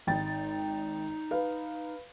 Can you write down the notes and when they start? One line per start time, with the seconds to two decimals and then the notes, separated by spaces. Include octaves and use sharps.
0.07 G#1 D#4 G5 A6
1.31 B4 F5